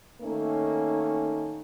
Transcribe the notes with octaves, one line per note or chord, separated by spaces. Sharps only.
D#3 A3 A#3 C#4 D#4